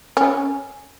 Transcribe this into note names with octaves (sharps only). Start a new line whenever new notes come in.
C#4